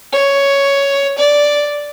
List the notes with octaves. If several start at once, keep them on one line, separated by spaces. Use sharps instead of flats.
C#5
D5